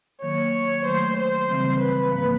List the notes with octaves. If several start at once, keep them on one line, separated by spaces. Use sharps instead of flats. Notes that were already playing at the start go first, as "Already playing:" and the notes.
D#3 F#3 A#3 C#5
D#3 F#3 A3 C5
C5
C#3 E3 G3 C4
B4
G#2 F3 A#3